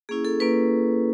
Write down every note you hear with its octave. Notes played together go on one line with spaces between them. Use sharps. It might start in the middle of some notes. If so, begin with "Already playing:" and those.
A#3 C#4 E4 G#4
A4
A#3 C#4 E4 B4